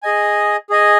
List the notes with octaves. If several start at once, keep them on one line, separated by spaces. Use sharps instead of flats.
G#4 D#5 G#5
G#4 D#5 G#5